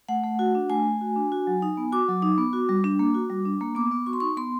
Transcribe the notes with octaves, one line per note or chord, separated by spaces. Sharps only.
A3 F#5
A3
F#4
D4
A3 G#5
A3
F#4
D4
F#4
F#3
D#4
B3
F#4 D6
F#3
D#4
B3
F#4
G3
D4
A#3
F#4
G3
D4
A#3
B3 D6
B3
F#4 C#6
C6
D#4 C#6
B3 C6